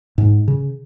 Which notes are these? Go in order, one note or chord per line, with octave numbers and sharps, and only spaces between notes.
G#2
C#3